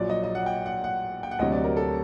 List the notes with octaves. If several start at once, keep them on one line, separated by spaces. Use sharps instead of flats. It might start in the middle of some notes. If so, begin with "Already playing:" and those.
Already playing: A#1 A#2 F#3 D5
D#5
D#5
F#5
G5
F#5
F#5
G5
F#5
D2 C3 F#3 D#5
D5
A#4
A4